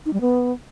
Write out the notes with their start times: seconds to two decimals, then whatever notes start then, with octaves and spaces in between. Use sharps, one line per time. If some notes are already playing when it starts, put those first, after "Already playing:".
0.06 D#4
0.13 G3
0.21 B3